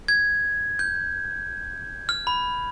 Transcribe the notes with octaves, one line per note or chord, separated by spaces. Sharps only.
G#6
G6
F6
B5